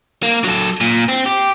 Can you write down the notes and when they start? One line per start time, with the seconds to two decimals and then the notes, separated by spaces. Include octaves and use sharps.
0.23 A#3
0.44 F#3 A4
0.81 A#2
1.08 C4
1.26 G4